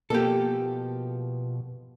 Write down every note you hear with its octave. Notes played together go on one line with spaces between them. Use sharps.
B2 F3 A#3 G4 A4